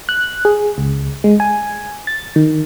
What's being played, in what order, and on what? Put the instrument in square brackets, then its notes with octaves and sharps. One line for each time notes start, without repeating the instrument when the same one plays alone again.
[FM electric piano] F#6
G#4
C#2
G#3
G#5
A6
D#3